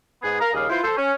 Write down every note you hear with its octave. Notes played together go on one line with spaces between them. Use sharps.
G#2 B3 G#4
A#4 F5 A#5
D#2 C#3 G3 G#4 D#5 F5
E4 F4 B4 C5
A4 C5
C#4